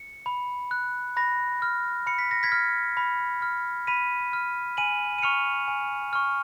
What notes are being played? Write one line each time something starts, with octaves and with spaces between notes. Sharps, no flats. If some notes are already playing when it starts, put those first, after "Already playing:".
Already playing: C#7
B5
F#6
B5 A#6
F6
B5 C#7
B6
A#6
G#6 B6
F6
B5
F6
B5 B6 D#7
F6
G#5 D#7 F#7
D#7
C#6 F6 C#7 F7
G#5
C#6 F6